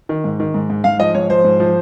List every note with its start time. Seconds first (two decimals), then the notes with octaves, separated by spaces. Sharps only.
0.09 D#3
0.24 G#2
0.40 D#3
0.54 G#2
0.70 G#2
0.84 G#2 F5
0.99 F3 D#5
1.14 G#2 C#5
1.30 F3 C5
1.44 G#2
1.60 F3